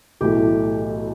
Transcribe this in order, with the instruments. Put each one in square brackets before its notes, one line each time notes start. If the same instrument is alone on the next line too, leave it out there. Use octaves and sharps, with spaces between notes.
[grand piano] B1 A2 E3 A3 E4 [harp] G4